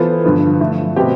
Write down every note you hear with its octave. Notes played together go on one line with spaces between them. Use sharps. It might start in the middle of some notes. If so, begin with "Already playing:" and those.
Already playing: E3 B3 F4 A4 C5
G2 D3 F3 B3
F3 A3 E4
B2 A3 C4 G4